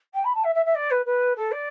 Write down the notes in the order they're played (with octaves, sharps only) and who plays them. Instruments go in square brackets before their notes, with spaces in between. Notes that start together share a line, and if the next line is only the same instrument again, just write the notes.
[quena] G5
B5
A5
E5
E5
E5
D5
B4
B4
A4
D5